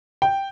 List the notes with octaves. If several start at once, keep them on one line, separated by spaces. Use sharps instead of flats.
G5